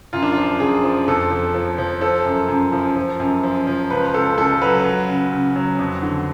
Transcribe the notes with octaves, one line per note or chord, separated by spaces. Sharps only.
F#2 F4
D4
F3 F4
F#2 G#4
F3
F2 A4
F3
F3
F3
F3 A4
F#2
F#2
F3
F3
F#2
F3
F3
C#2 B4
C#2 A4
C#2 A4
F#3 B4
F#3
C#3
C#3
F#3
F2
D3